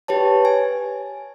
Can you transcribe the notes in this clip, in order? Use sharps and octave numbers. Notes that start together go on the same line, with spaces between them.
G4 B4 C#5 A5
G#5